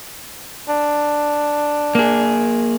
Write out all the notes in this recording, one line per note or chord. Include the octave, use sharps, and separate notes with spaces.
D4
A#3 G#4